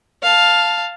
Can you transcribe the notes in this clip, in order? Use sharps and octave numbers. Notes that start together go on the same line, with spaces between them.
F5 A5